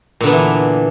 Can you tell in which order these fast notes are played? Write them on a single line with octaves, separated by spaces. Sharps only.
A#2 D3 B3 D4 E3